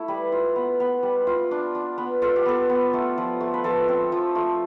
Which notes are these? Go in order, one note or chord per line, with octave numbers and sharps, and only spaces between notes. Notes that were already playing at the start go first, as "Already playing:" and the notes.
Already playing: A3 E4
G3 B4
F4
B3
B3
G3
F4
D4
D4
B3
F4 A4
G4
B3 A4
B3
A3 A4
F3
A3
B4
F3 A4
C4
F3
A3 F4